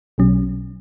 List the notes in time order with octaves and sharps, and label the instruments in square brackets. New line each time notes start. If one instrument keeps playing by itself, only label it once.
[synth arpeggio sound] B1 B2 F#3 C#4